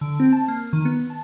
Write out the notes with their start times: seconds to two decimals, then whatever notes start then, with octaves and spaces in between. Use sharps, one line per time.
0.01 D3
0.20 C4
0.33 A5
0.48 A#3
0.73 D#3
0.85 B3
1.10 A5